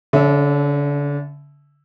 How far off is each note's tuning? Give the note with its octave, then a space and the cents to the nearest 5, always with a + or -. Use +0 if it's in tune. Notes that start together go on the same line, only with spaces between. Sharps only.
D3 -35 C#4 +0 E5 +0